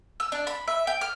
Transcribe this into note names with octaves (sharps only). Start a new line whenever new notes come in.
E6
D4
B5
E5
G5
F6